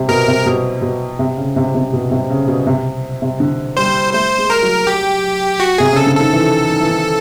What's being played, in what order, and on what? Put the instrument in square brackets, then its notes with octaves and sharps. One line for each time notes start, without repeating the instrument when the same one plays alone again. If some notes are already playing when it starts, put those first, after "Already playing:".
Already playing: [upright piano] C3
[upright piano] B2 [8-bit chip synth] A#4
[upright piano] C3
B2
B2
C3
C#3
C3
C3
B2
C3
C#3
B2
C3
C3
D3
[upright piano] G3 [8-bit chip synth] C5
[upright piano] A3 [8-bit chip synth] C5
[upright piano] G#3
[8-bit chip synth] A#4
[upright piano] F#3
[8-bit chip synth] G4
F#4
[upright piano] C3 [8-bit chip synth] G#4
[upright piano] C#3 [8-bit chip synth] A4
[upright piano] D3
[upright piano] D#3 [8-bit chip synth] A4
[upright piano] E3
D#3
E3
D#3